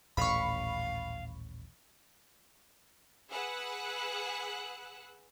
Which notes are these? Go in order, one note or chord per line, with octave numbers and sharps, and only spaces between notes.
D#1 A1 D#2 F5 B5 C#6
G#4 B4 F#5 E6 F#6